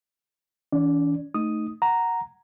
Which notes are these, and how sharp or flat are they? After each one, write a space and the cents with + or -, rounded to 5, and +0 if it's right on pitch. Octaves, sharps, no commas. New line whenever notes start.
E3 -35 C#4 +45 D5 -5
A3 +0 D#4 +0 D#6 +0
F#5 +0 A#5 +0